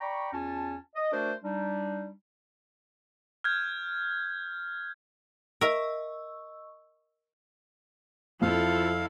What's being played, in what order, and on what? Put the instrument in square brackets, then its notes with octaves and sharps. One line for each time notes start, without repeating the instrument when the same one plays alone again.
[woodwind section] D5 G5 A#5 B5 C#6
E2 C#4 F4 A5
D#5
A3 D4 F#4 A#4 C5 D5
G3 D4 D#4
[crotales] F6 G6 G#6
[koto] A#4 E5 [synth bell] D#5 C#6 E6
[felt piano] F2 [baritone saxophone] F3 [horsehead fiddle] E4 A4 [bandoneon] F5